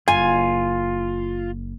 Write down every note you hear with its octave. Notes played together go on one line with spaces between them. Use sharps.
F#1 F4 G#5